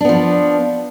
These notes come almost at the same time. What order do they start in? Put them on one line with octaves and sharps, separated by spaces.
D4 B3 F3